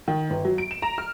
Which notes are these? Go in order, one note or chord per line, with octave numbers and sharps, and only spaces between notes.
D#3
G1
F#3
D7
E7
A#5
F6